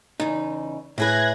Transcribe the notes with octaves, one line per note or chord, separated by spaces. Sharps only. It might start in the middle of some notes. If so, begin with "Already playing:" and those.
E2 C#3 D#4
A2 E4 G#4 B4 F#6 G#6 A#6